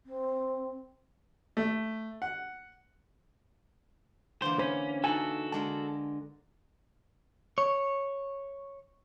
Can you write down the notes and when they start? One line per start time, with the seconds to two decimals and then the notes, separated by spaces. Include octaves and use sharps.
0.06 C4
1.57 A3
2.22 F#5
4.42 D3 E3 A#3 C5
4.59 C#4 C5 B5
5.04 D#4 F#4 A4 G#5
5.52 D3 G#3 A#4 A5
7.58 C#5